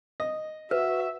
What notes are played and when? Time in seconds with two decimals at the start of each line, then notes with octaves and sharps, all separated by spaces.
0.20 D#5
0.71 F#4 B4 E5